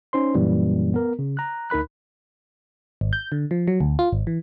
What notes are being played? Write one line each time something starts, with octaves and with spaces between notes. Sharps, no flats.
C#4 D#4 C5 C6
F#2 A#2 E3 G3 A#3
B3 A#4
C#3
A#5 F#6
D2 D#4 A#4 B5 F#6
G#1
G6
D3
F3
F#3
D2
F4
G#1
E3